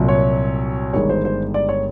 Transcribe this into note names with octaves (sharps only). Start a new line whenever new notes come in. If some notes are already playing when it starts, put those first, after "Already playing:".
Already playing: C2 A#2 F#3
C#5
G1 G2 D#3 G#3 C#5
C5
C5
D5
C#5